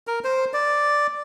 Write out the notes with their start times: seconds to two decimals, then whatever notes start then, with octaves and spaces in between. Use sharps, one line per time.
0.07 A#4
0.24 C5
0.54 D5